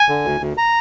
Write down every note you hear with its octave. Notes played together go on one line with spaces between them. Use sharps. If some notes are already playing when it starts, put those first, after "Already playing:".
Already playing: G#5
D3
D2
D2
A#5